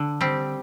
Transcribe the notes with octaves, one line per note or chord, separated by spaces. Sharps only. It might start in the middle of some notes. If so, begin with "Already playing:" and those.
Already playing: D3
G3 C4